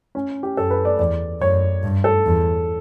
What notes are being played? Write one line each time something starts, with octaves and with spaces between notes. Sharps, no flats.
C#4
G4
F#2 A4
B4
D5
E2 D5
F#2 C#5
G2
A4
E2